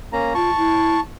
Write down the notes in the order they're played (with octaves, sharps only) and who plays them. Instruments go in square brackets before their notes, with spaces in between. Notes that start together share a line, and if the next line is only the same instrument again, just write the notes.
[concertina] A#3 C#4 A#5
[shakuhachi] F4 [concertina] A5 C#6
[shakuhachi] E4